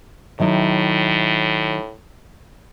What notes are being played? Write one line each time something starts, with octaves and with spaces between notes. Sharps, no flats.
A2 D#3 F#3 E4